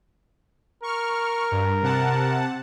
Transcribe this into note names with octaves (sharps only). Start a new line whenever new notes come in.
A#4 C#6 F6
G2
C3 F#5 A5